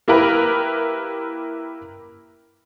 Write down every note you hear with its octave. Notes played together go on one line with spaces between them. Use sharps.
A#3 E4 G4 A#4 B4